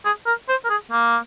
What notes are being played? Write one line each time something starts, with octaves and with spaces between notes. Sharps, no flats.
G#4
A#4
C5
A#4
G#4
A#3